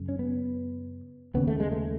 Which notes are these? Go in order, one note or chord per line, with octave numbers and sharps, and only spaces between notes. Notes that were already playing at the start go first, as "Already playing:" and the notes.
Already playing: F#2 C#3
C#4
B3
D#2 C#3 B3
A3
G#3
A3